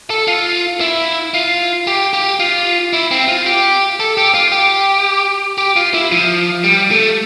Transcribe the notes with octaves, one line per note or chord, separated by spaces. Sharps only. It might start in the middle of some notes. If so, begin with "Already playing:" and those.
A4
F4
E4
F4
G4
G4
F4
E4
C4
F4
G4
A4
G4
F4
G4
G4
F4
E4
F3
G3
A3